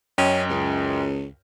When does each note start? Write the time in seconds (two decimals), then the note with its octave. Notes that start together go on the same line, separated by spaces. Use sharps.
0.18 F#2 C#4 D#5 G5
0.50 C#2